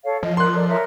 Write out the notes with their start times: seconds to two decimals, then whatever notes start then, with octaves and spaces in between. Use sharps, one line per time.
0.04 A4 C#5 F5
0.23 F3 D#5
0.37 A#4 C6 F#6
0.54 A4 A#4 D5
0.68 A#4 C#5 E5